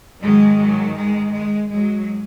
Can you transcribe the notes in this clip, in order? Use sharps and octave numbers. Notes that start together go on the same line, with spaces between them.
G#2 D#3 F#3 G#3
F#3
G#3
G#3
G#2 F#3 G#3